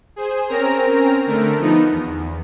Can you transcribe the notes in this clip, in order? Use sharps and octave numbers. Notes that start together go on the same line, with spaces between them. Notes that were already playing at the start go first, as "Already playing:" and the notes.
G#4 C5
C4 C#4 A#4 A#5
D3 A3 A#4
F3 B3 D#4
E2